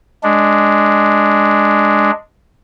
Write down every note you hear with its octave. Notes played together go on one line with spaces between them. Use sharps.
G#3 D4